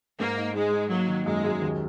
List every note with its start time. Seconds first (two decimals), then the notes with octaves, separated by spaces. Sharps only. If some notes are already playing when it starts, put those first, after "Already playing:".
0.19 G#2 A#3
0.37 D#4
0.55 G#3 D#4
0.73 D#4
0.90 F#3 A#3
1.08 D#3
1.26 F#2 G#3
1.44 F#2
1.62 D#2